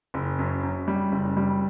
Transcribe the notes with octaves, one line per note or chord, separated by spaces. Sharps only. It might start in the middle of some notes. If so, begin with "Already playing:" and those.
F#1
F#2
F#2
G3
F#1
G3